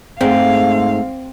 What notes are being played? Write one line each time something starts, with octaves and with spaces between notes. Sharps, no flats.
G#2 A3 C4 F5